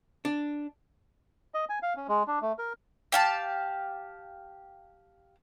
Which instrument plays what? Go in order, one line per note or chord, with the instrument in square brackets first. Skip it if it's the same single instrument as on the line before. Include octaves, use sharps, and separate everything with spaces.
[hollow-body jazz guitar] D4
[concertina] D#5
G#5
F5
C#4
G#3
D4
A3
A#4
[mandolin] G4 F5 A5